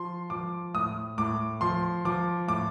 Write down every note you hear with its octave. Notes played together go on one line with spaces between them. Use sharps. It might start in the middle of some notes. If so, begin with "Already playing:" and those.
Already playing: F3 C6
F3 D6
A2 D#6
A2 D6
F3 C6
F3 D6
A2 D6